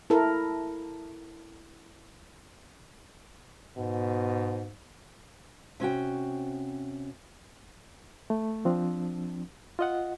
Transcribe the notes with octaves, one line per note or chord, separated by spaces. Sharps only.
E4 A4 A#4
G#2 B2
C3 C#4 F#4 G5
A3
F3 C4 D4
F4 D#5 F#5